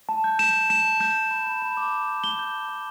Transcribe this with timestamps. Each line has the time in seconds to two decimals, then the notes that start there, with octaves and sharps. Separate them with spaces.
0.09 A5
0.24 G6
0.39 G6 E7
0.55 G6
0.70 A5 E7
0.85 A5
1.00 G6 E7
1.16 G6
1.31 B5
1.47 B5
1.62 B5
1.77 D6
1.93 B5
2.08 G6
2.23 G6 G7
2.39 G6
2.54 A5
2.69 A5